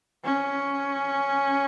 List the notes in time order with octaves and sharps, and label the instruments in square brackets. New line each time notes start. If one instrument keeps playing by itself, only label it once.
[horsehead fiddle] C#4